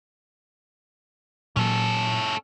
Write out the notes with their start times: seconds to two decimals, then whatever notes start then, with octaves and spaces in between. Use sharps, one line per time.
1.57 A#2 F#3 C#4 A4